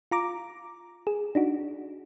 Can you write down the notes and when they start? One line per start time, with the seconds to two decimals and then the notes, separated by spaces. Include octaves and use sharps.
0.11 F4 A#5 D6
1.07 G#4
1.35 D4 D#4 F#4